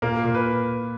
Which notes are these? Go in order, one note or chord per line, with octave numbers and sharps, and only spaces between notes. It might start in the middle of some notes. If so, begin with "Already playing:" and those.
A#2 A#3 A#4
A#2
B4